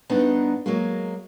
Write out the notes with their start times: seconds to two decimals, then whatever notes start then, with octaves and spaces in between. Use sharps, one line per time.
0.09 G2 B3 D4 D#4
0.66 F#3 G#3 A#3